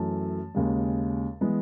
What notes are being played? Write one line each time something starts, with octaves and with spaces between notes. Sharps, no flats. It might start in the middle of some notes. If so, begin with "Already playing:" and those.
Already playing: F#2 E3 A3 A5
D#2 C#3 G#3
E3 G#3 B3